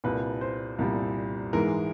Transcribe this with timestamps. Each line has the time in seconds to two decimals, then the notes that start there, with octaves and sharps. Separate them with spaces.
0.04 C2 A#2 G3 B4
0.41 C5
0.79 C2 A#2 G3
1.53 G#2 E3 G#3 A#4